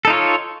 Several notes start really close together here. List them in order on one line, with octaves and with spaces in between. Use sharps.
A4 D#4 F4 C#5